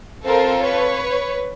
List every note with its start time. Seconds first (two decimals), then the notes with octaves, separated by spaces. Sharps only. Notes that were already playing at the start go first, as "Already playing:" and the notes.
0.24 C4 F4 A4 A#4 C5
0.62 B4 C#5